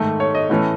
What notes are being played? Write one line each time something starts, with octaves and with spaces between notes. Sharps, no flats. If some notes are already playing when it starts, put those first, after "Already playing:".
Already playing: G#2 D#3 A3
C#5
D#5
A2 E3 A3 C#4